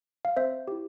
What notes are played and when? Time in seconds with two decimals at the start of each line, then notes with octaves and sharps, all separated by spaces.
0.25 F5
0.37 C4 C5 E5
0.68 E4 G4